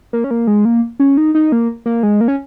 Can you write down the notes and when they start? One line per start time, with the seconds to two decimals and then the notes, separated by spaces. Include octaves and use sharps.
0.13 A#3
0.24 C#4
0.31 A#3
0.47 G#3
0.65 A#3
1.00 C#4
1.17 D#4
1.35 D#4
1.52 A#3
1.86 A#3
2.03 G#3
2.21 A#3
2.28 C#4